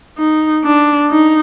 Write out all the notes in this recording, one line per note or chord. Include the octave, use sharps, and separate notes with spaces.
D#4
D4
D#4